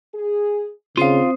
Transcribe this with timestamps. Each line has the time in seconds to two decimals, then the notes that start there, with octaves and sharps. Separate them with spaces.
0.15 G#4
0.97 D#2 C#3 C4 F4 C5 F5 D#6